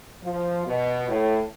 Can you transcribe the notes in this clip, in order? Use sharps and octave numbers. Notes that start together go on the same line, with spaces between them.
F3
B2
A2